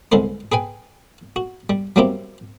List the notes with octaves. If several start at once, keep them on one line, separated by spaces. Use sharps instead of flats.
C2 D3 G#3 B4 C5
G#4 B4 G5 G#5
F#4
G3
F#3 G3 A#3 C4 E4 G4